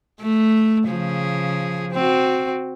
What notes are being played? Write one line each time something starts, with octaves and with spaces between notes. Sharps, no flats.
A3
C#3 F3 G#4
C4 F#4